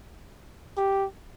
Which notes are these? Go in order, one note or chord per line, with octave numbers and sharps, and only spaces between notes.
G4